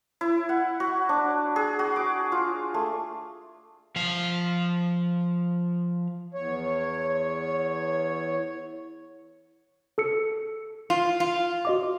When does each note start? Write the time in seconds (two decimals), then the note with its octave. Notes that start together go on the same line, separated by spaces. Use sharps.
0.21 E4
0.49 F#5
0.80 F#4
1.09 D4
1.56 G#4
1.79 F#4
1.96 D6
2.32 F4
2.74 A3
3.96 F3 F5
6.34 E2 C#5
9.98 A4 E6 C#7
10.90 F4
11.20 F4
11.65 F#4 D#5 D6